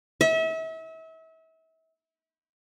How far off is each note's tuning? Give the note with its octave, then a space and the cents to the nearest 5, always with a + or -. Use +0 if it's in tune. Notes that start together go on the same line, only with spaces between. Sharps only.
E5 -35